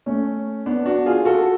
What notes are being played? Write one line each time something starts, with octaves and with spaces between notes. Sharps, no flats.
A3 C#4
B3 D4
D4 F#4
F4 G#4
F#4 A4